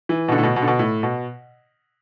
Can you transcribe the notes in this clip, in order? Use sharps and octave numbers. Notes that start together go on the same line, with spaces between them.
E3
B2
D3
A2
B2
B2
D3
B2
A2
B2